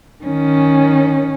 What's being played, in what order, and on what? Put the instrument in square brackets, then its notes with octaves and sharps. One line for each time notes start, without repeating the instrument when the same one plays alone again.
[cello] D#3 C#4